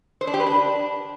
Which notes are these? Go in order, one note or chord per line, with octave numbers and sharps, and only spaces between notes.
C5
D4
G4
B4
D4